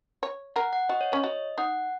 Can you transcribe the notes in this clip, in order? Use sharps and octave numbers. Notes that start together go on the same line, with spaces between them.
C#5
A#4 F#5
F#5
F#4 D#5
C#5
C#4 C#5
F#4 D#5
D#4 F#5